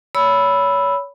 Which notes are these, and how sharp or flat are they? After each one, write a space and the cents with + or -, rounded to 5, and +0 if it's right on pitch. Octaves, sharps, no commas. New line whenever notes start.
C#5 +25 B5 +0 E6 +0